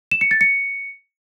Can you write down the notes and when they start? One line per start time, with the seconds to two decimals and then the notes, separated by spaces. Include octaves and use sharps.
0.11 E7
0.21 C#7
0.31 A6
0.41 C#7